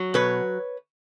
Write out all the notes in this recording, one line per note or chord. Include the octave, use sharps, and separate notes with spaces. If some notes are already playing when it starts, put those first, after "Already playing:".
Already playing: F#3
B2 B4 C#5